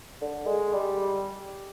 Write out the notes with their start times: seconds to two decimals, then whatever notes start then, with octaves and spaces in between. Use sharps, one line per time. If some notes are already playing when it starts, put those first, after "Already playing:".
0.21 D3
0.46 G#3
0.73 G3